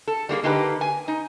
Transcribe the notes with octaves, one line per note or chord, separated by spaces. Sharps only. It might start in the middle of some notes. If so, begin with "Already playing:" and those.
A4
G3 A#3 F#4 G#4
D3 A#3 D#4 G4 A4 B4
G#5
D#4